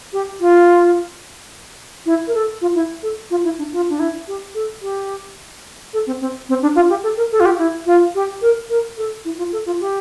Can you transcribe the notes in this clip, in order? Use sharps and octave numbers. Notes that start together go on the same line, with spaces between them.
G4
F4
E4
A#4
A4
F4
E4
A4
F4
E4
D4
F4
D4
E4
G4
A4
G4
A4
C4
C4
C4
D4
F4
G4
A4
A#4
A4
F4
G4
E4
F4
G4
A#4
A#4
A4
E4
F4
A4
F4
G4